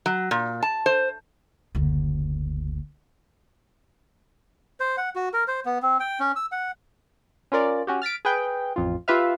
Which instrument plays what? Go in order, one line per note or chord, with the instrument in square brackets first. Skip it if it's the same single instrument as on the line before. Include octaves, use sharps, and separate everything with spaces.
[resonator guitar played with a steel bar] F#3
A#2
A5
C5
[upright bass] F#1 D2
[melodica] C5
F#5
F#4
A#4
C5
B3
C4
G5
C#4
E6
F#5
[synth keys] C#4 F4 A#4 D5
C#4 F#4 G4
F6 A6 B6 D7
G#4 B4 G5
A1 F2 F4
F4 G4 B4 E5 F5